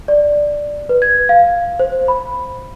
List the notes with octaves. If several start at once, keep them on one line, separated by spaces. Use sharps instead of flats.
D5
B4
G#6
F5
C5
B5